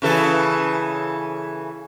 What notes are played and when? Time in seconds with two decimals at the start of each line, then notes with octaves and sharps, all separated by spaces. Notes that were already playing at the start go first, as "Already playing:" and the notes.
0.02 C#3 E3 A4